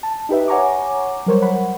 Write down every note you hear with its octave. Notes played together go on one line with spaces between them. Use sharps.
A5
D#4 G4 B4 E5
C#5 F#5 G#5 A#5 C#6 D6
F#3 G3 A#4 C5 C#5
F#5 B5